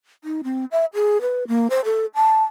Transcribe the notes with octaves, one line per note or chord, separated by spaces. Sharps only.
D#4
C4
E5
G#4
B4
A#3
C5
A4
A5